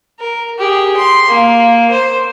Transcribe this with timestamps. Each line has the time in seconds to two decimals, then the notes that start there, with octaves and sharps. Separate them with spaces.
0.19 A#4
0.59 G4 G#4
0.96 C6
1.28 A#3
1.90 C5